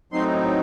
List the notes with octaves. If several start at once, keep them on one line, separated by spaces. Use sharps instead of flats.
A2 F#3 C4 D#4 C6